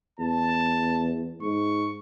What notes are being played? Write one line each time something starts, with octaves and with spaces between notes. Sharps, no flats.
E2 A5
G#2 C#6